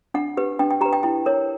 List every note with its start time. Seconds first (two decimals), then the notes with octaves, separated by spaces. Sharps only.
0.14 D4 F#5
0.37 G4 B4
0.59 D4 G5
0.71 G5
0.81 G4 B4 A#5
0.93 G5
1.03 E4 G5
1.26 A#4 C#5